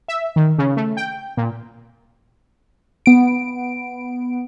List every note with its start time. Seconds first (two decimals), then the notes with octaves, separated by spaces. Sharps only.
0.08 E5
0.36 D#3
0.58 C#3
0.77 A3
0.97 G5
1.37 A#2
3.06 B3 D7